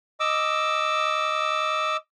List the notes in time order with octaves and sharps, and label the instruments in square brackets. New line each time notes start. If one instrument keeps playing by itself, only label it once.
[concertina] D#5 D6 E6